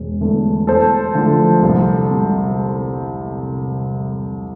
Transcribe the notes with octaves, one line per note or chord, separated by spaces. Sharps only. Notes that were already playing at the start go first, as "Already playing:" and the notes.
Already playing: E1
E2 D3 A3
E2 A4 C5
D3 F3 A3
C2
C3 G3